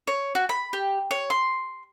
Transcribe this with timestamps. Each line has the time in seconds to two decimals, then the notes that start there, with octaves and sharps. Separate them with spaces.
0.07 C#5
0.35 F#4
0.49 B5
0.73 G4
1.11 C#5
1.30 C6